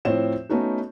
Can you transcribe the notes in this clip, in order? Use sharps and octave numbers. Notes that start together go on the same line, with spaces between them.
A2 F3 C4 C5 C#5 E7
A3 B3 C#4 D#4 F#4